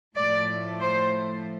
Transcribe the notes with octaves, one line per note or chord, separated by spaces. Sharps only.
A2 F3 A3 D5
C5